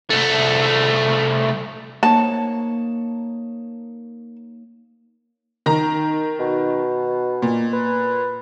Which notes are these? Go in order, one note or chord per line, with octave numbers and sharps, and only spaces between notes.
C2 A3
A#3 D#4 C#5 A5
D#3 A#5
B2
A#2
B4